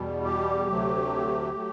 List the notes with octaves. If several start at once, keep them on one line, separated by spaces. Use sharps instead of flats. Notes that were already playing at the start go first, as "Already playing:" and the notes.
Already playing: E2 B2 G3
G4
D2 C3 F#3 A3
F#3 A3